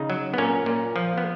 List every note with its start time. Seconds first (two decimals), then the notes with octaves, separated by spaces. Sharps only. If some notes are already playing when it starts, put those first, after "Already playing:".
Already playing: C#3 D#4
0.10 F#3
0.34 B3
0.38 A#2 C#4
0.66 A#2
0.96 F3
1.18 B3